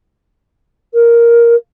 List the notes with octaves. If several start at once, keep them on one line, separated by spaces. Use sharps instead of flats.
A#4